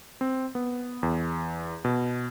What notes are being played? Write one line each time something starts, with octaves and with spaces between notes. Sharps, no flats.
C4
B3
E2
B2